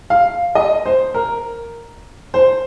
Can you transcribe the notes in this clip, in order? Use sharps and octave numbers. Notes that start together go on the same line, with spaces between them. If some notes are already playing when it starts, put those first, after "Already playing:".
F5
D#5
C5
A#4
C5